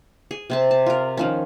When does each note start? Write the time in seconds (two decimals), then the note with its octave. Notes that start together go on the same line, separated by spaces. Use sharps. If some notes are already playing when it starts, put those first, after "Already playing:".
0.31 G#4
0.50 C3 C4 A5
0.71 A5
0.86 F4 A#4
1.17 D#3 F3 C#4